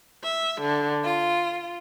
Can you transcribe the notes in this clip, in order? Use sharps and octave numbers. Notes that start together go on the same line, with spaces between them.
E5
D3
F4